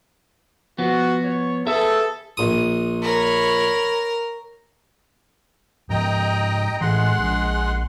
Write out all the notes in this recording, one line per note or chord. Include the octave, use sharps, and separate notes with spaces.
F3 B3 F#4
C#5
G#4 A4 B4 E5
A#1 D#6
A#4 C#5 B5
G#2 F3 D#5 G5 A#5
A2 E3 G#3 F#5 C6
A#1 F3